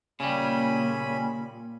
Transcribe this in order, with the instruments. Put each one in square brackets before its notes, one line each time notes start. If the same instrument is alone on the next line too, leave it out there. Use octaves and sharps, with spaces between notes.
[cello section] A#2 [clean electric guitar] C#3 G3 [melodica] C#4 G#5 B5